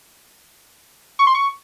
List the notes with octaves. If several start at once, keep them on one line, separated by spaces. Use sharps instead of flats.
C#6
C6
C#6